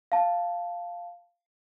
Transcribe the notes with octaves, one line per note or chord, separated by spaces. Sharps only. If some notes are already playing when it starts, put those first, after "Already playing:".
F5 A5